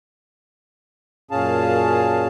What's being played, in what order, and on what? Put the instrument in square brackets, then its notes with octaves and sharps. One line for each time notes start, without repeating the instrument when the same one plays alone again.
[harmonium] F#2 A#2 C#4 G#4 F5 A5